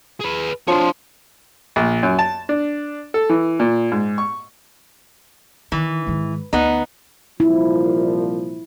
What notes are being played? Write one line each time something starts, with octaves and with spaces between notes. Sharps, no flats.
G#4 B4
F3 D4 C#5 C6
A#1
F#2
A5
D4
A4
E3
A#2
G#2
C#6
D#3 E3
G#2 D#3
D2 B3 D#4
C2 A#2 F3 E4